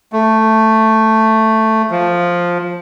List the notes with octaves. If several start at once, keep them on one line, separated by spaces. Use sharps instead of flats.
A3
F3